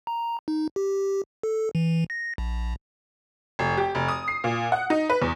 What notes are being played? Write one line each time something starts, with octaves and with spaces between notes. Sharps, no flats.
A#5
D#4
G4
A4
E3
A#6
A#1
F1
G4
F1
D#6
C7
A#2
F#5
D#4
B4
E2